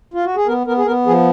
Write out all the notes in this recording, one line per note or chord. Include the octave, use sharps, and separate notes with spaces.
F4
F#4
G#4
B3 A#4
B3 A#4
G#4
B3 A#4
F3 G#4